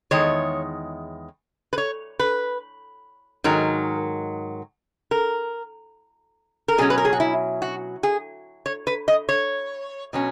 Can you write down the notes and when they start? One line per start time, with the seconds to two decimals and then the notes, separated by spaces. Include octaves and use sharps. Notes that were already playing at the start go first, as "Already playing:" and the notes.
0.11 E2 D#3 G#3 C#5
1.73 B4
1.78 C#5
2.19 B4
3.44 G#2 D#3 F#3 A#4
5.11 A#4
6.68 A#4
6.78 B2 F#3 C#4 G#4
6.90 B4
6.98 A#4
7.05 G#4
7.13 F#4
7.20 E4
7.62 F#4
8.03 G#4
8.66 C#5
8.87 B4
9.08 D#5
9.29 C#5
10.13 B2 F#3 C#4